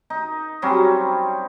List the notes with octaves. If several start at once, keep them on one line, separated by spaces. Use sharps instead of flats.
D#4
F#3 G3 C4 C#4